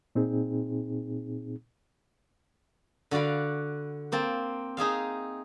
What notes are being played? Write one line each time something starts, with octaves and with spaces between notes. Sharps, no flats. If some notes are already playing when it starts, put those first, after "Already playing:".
A#2 C4 D#4 G#4
D3 F#4 D5 F5 B5
A#3 C4 A5
D#4 G#4 E5 F5